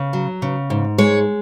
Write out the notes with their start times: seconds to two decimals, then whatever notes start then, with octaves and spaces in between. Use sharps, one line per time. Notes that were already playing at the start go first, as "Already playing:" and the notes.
Already playing: C#3
0.13 F#3
0.42 C#3
0.70 G#2
0.98 G#3 C#5